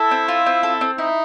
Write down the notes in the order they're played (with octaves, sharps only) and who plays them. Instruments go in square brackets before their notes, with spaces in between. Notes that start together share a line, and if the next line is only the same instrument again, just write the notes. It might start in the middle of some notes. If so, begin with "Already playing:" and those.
Already playing: [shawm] E4 [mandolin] A4
[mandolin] C4
F4
C4
A4
C4
[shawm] D#4 [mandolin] E4